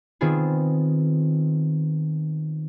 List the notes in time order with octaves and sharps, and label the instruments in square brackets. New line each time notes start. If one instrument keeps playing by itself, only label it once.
[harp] D#3 B3 C4 F4 G#4